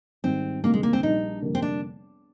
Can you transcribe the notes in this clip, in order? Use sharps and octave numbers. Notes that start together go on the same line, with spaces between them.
G#1 G#2 G3 C4
D2 C3 D#3 G3 A#3
G#3
A#3
C4
A#1 A#2 G3 D4 D#4
F1 F2 D3 G3 A#3
C4
D4